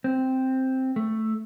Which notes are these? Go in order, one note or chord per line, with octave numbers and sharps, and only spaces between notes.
C4
A3